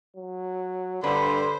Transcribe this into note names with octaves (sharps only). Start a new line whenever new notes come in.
F#3
G2 D3 B4 C5